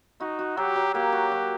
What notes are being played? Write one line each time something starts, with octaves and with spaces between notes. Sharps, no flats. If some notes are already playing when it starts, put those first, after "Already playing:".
D#4 F#4
F#4
F#3 G4
F#3
A#3 G4
F#4
F#3